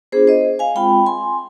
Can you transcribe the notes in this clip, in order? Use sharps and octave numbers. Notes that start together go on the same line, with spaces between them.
B3 D4 F4 G#4 C5
C5 D#5
F5 G#5
G#3 C4 F4 G5 B5
G#5 C6